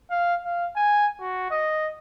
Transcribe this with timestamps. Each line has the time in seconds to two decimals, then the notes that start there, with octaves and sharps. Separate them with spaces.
0.10 F5
0.43 F5
0.75 G#5
1.20 F#4
1.51 D#5